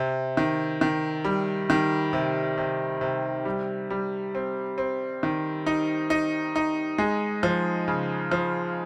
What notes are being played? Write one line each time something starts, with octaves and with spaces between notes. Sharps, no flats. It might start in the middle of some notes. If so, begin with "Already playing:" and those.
Already playing: C3
D#3
D#3
G3
D#3
C3
C3
C3
G3
G3
C4
C4
D#3
D#4
D#4
D#4
G#3
F3
C#3
F3